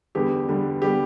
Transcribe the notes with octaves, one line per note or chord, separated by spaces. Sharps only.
E2 D3 G3 B3 G4
E2 D3 G3 B3
D3 G3 B3 G4